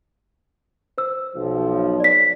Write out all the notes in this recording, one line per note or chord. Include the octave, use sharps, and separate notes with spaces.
C5 E6
B1 F3
D5 B6